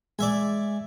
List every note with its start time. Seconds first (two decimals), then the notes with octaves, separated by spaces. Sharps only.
0.19 G#3 D5 E5 G#5